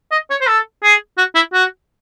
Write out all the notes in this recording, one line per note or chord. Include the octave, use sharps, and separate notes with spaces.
D#5
C#5
C5
A4
G#4
F#4
E4
F#4